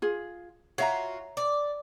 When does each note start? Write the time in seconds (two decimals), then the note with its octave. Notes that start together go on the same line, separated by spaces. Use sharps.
0.02 F4 G#4
0.78 F4 F#4 C#5 E5 A#5
1.37 D5